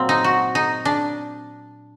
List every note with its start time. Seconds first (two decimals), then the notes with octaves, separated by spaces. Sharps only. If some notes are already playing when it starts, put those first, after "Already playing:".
Already playing: A#2 F#3 A#3 C4
0.09 D#4
0.24 F#4
0.55 D#4
0.85 D4